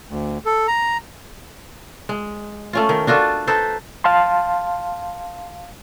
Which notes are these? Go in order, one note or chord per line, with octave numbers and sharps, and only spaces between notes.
D2
A4
A#5
G#3
A3 C#4 F4
D#3
D4 F4 F#4 A4
D#4 A4 B4 C5
F5 A5 C6